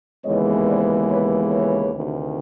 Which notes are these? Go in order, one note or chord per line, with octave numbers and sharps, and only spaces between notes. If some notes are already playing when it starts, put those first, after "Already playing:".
D#2 C#3 E3 G#3 B3 C#5 D#5
C5 D5
B4 C#5
B4 C#5
D2 C3 D#3